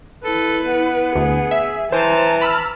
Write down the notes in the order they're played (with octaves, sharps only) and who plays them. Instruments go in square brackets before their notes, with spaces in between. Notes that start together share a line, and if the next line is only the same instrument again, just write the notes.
[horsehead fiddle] E4 B4 [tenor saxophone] A4
[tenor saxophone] B3
[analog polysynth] D2 [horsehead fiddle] G#4
[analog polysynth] E5
[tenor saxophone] E3 [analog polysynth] C5 [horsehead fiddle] A5 A#5
[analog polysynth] B5 E6 F6